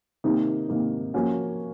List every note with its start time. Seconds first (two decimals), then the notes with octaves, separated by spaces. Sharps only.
0.24 C3 D#3 A#3 D#4
0.69 C3 D#3 A#3 D#4
1.14 F3 A#3 C#4 F#4